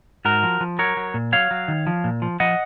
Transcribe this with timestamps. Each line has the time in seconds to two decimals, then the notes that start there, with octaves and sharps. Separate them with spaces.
0.25 G#2 F#4 A#4
0.43 F3
0.61 F3
0.79 F#3 A#4 C#5
0.97 F#3
1.14 A#2
1.32 F#3 C#5 F5
1.51 F#3
1.68 D#3
1.87 F3
2.04 A#2
2.22 F3
2.40 F3 D#5 F#5